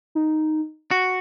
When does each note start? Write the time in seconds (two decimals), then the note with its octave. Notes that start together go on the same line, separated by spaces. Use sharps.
0.15 D#4
0.91 F#4